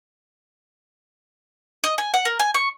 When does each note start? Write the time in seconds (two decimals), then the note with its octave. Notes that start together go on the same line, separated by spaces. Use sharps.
1.84 D#5
1.98 G#5
2.14 F#5
2.25 A#4
2.39 G#5
2.54 C#6